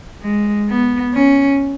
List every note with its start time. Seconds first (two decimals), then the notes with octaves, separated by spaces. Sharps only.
0.22 G#3
0.69 B3
1.14 C#4